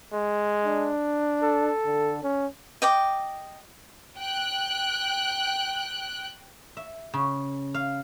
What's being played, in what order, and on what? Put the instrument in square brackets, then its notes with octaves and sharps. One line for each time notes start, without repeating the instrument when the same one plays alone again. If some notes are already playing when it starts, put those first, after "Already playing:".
[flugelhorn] G#3
[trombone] D4
[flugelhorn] A4
[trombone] D3
C#4
[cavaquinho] D#5 G5 D6
[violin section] G5 F#6
[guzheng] E5
C#3
F5